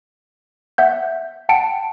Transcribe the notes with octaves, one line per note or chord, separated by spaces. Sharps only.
E5 F#5 G6
F#5 G5 A5 C#7 D7